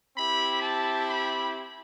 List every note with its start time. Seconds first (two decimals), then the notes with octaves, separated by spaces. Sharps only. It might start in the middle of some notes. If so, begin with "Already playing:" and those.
0.16 C4 E4 G4 B5
0.62 A5
1.08 B5